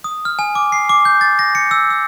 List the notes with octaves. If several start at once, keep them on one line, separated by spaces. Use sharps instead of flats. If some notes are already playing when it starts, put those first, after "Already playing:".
D#6
F6
G#5
D6
C7
D6
G6
A6
A#6
C#7
E6
E6